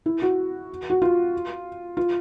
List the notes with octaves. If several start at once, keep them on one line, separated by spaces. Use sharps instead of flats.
E4
F#4
F#4
F4
F4